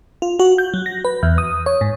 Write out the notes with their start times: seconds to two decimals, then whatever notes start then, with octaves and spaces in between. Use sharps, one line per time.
0.22 F4
0.39 F#4
0.58 G6
0.74 F#3
0.86 A#6
1.05 B4
1.23 E2
1.38 D#6
1.66 C#5
1.81 G#2